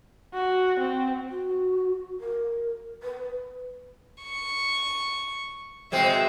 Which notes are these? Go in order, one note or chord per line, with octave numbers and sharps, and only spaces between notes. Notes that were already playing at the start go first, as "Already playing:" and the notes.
F#4
C4
F#4
A#4
B4
C#6
B2 G#3 C4 E5